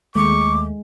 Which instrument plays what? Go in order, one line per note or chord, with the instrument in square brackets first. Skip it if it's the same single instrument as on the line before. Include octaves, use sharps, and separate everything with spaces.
[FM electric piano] D#2 A3 [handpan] G#3 [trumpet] C#6 [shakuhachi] D6